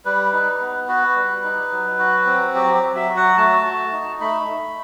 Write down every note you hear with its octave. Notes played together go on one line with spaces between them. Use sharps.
G3 B4
D#4
B3
F#4 B4
G3
D#4
F#3
F#4
C4
F#3 G4
G4
F#3
E5
F#4
F#5
A3 A5
F#4
D#4
A3 B5
A3